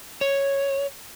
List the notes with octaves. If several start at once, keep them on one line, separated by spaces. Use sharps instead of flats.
C#5